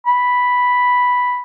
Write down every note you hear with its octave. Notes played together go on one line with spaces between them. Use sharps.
B5